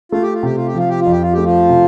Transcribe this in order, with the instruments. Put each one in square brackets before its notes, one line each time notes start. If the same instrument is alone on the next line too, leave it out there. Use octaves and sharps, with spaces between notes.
[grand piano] A3 [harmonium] F4
[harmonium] G4
F4
[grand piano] C3 [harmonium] G4
[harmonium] F4
G4
[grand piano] F3 [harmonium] F4
[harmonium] G4
F4
[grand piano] F2
[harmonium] G4
F4
[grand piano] A3 [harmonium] G4
[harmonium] F3 F4
[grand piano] C3